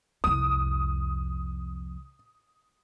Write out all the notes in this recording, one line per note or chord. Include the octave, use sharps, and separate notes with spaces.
C2 F2 D#6